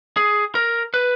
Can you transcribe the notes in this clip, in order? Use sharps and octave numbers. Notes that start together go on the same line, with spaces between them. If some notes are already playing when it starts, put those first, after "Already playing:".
G#4
A#4
B4